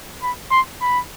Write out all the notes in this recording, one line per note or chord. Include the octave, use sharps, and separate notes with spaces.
B5
C6
B5